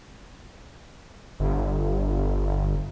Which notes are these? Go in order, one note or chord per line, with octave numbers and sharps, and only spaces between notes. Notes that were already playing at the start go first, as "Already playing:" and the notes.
G1